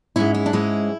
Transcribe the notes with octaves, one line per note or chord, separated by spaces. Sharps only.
G#2 G#3 C#4 E4
E4
D4
G#2 G#3 C#4 E4